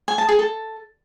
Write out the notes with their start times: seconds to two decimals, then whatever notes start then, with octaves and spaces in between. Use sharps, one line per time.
0.08 G#5
0.18 A5
0.29 G#4
0.39 A4